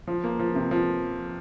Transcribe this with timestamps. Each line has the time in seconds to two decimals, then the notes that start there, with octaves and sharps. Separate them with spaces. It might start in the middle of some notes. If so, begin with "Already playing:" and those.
0.07 F3
0.24 A#3
0.39 F3
0.55 C3
0.71 F3